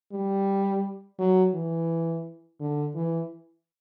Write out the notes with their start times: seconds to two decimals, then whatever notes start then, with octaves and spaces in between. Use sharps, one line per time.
0.12 G3
1.19 F#3
1.54 E3
2.61 D3
2.95 E3